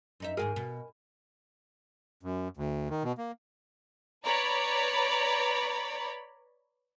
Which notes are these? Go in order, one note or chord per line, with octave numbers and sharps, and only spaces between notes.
F#2 D#4 E5
D#2 G#2 G#4 A#4 G#5
B2
F#2
D2
D#3
B2
A#3
B4 C#5 D5 A#5 B5